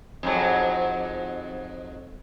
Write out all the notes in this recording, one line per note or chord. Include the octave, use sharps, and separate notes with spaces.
F2 G#2 F#3